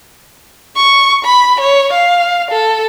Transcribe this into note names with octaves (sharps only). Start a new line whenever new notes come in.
C#6
B5
C#5
F5
A4